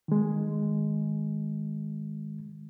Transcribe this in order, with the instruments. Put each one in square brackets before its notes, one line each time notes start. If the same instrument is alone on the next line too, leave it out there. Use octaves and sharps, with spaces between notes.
[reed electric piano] D#3 G#3